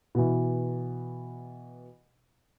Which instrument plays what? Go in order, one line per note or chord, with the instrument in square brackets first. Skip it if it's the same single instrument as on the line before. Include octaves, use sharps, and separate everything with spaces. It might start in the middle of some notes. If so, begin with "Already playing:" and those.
[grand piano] B2 E3